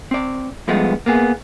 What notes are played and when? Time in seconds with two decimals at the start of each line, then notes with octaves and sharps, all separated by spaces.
0.11 C4 D5
0.68 G2 F3 G#3 A3 B3
1.06 A#3 B3 G#4